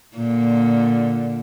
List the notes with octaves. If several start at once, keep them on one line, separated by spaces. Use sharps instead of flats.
A#2 D3